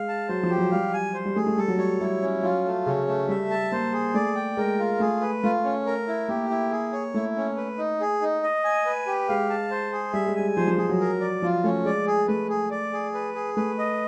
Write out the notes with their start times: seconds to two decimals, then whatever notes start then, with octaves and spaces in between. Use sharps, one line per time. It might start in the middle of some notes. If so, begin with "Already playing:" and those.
Already playing: G#3 F5
0.08 A5
0.29 F#3 C5
0.43 F3
0.50 G4
0.58 F#3
0.71 G3 F5
0.93 G#5
1.14 C5
1.25 G3
1.36 A3 G#4
1.47 A3
1.58 G3 A4
1.68 F#3
1.78 G3 C#5
2.00 G3 E4
2.22 C#4
2.43 F#3 F4
2.65 A3
2.86 C#3 C#4
3.07 A3
3.28 G3 E5
3.50 A5
3.72 A#3 C5
3.93 G#4
4.14 A3 D5
4.35 G5
4.57 G#3 A#4
4.79 F4
5.00 A3 G#4
5.21 B4
5.43 A3 F4
5.64 C#4
5.86 A#4
6.08 E4
6.29 A#3 G4
6.50 E4
6.71 G#4
6.92 C#5
7.14 A3 E4
7.36 C#4
7.57 B4
7.78 D#4
8.01 G#4
8.21 D#4
8.43 D#5
8.64 G#5
8.86 B4
9.07 G4
9.29 G#3 F5
9.50 A5
9.71 C5
9.92 G#4
10.13 G3 E5
10.27 G#3
10.36 G3 G#5
10.57 F3 C5
10.67 F3
10.78 F3 G#4
10.89 F#3
11.00 A#4
11.21 D5
11.42 F3 F4
11.64 A3 C#4
11.85 G#3 D5
12.07 G#4
12.28 A3 B4
12.49 G#4
12.71 D5
12.93 G#4
13.14 B4
13.35 G#4
13.57 A3 B4
13.79 D#5